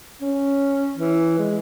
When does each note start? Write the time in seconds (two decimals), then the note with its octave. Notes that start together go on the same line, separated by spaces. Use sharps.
0.22 C#4
0.97 E3
1.39 G#3